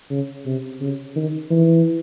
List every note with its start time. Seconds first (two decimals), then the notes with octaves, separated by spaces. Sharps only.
0.10 C#3
0.46 C3
0.81 C#3
1.16 D#3
1.51 E3